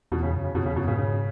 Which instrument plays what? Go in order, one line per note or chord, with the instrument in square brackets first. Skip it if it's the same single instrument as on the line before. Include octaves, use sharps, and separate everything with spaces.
[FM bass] E2 [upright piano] B2
[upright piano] C#3
[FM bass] F#2
[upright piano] C#3
[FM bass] F#2 [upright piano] B2
[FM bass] E2 [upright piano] C#3
[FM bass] F#2 [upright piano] B2
[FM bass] G#2 [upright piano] C#3
[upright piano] C#3